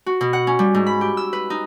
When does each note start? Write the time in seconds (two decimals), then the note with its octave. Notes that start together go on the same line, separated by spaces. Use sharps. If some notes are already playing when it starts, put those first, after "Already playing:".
0.06 F#4
0.21 B2
0.33 F#5
0.47 C#4
0.59 G3
0.74 G#2
0.86 B5
1.01 G4
1.17 E6
1.33 B4
1.50 D#4